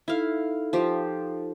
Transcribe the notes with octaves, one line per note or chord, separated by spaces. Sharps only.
D#4 E4 A4 F5
F3 G4